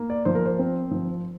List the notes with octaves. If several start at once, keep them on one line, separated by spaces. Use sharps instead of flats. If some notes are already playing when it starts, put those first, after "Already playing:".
Already playing: A#3
D5
F3 C5
A#4
C5
C4
F3